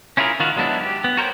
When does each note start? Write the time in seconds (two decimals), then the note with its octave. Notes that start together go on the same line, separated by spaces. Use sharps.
0.17 C#4 E4 F4 G#4 A#4
0.40 D#3 F4 F#4 F5
0.56 F#3 G#3 B3 D4 E4
0.81 G4
1.04 B3
1.17 F#4 A#4 C5 C#5 G5